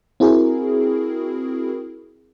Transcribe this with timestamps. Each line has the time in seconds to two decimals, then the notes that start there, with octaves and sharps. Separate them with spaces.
0.20 C4 E4 F#4 G#4 A#4